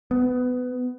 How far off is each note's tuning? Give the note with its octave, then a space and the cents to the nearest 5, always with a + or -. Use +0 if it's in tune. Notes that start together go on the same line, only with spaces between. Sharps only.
B3 +20